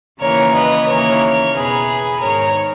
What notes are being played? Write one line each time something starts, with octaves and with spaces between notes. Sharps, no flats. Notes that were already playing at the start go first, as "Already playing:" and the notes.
D#2 C#3 E3 A#4 C#5
B4 D#5
D#2 C#3 E3 A#4 C#5
E2 B2 G#4 B4
G#2 D#3 A#4 C#5